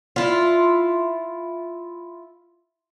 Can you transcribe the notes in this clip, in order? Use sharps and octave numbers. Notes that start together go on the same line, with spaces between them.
E4 F4